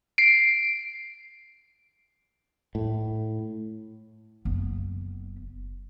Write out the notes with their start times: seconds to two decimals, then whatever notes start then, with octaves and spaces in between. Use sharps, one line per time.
0.18 C7 D7
2.75 A2
4.45 F#1 B3